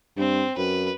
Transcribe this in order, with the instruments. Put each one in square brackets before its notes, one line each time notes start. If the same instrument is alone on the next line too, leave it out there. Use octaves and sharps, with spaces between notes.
[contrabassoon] G2 [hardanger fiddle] C4
[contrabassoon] F#2 [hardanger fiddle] B4